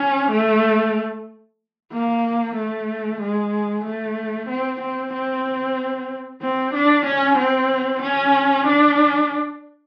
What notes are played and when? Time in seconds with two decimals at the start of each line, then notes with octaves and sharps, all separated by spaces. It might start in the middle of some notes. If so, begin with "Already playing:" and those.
Already playing: C#4
0.32 A3
1.93 A#3
2.56 A3
3.21 G#3
3.85 A3
4.49 C4
4.81 C4
5.13 C4
6.42 C4
6.74 D4
7.06 C#4
7.38 C4
8.02 C#4
8.67 D4